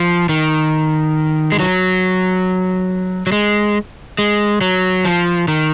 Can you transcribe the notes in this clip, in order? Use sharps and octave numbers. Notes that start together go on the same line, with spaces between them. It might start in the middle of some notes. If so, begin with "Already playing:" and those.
Already playing: F3
D#3
G#3
F#3
F#3
G#3
G#3
F#3
F3
D#3